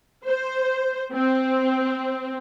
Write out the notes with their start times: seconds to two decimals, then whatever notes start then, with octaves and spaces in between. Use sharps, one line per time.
0.25 C5
1.12 C4